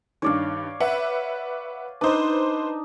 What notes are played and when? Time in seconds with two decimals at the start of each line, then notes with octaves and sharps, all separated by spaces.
0.22 G2 D#3 C#5 D5 F5
0.80 B4 E5 F#5
2.01 D4 D#4 B4 C5